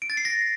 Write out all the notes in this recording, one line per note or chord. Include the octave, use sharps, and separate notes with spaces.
D7
A6
C7
A#6